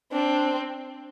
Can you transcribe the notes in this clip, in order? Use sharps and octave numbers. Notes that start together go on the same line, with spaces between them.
C4 D4